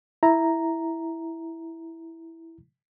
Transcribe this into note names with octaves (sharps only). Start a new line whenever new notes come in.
E4 A#5